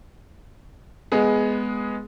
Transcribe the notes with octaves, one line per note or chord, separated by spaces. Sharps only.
G#3 B3 G#4